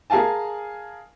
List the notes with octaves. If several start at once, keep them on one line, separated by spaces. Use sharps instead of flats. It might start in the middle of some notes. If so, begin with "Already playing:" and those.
G#4 A#4 F5 G#5 A5